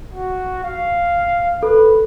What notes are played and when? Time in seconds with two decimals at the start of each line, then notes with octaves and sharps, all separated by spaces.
0.12 F#4
0.64 F5
1.63 A4 B4